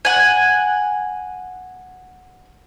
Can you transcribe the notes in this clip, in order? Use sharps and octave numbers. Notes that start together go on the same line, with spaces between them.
F#5 G#5